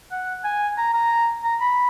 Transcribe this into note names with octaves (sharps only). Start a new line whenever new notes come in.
F#5
G#5
A#5
A#5
A#5
B5